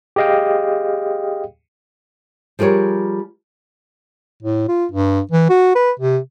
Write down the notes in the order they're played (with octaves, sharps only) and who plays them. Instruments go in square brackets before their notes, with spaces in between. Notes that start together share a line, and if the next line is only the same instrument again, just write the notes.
[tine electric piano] G4 G#4 D#5 F5 G5
[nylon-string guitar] F3 G3 G#4 A#4 C#5
[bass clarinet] A2
F4
G2
E3
F#4
B4
C3